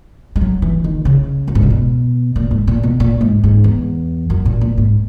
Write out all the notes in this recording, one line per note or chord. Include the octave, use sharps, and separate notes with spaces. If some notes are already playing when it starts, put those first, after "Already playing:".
G#3
F#3
E3
D#3
C#3
F#2
G#2
A#2
B2
A#2
G#2
A#2
B2
A#2
G#2
G#2
E2
F#2
A#2
A#2
G#2